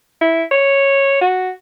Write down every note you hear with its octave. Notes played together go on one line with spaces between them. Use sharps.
E4
C#5
F#4